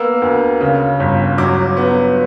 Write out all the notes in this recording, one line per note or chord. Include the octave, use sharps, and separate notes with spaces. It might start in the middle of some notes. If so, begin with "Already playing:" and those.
Already playing: A#3 B3 E6
D2
C#3
G1
F#3 D6
B3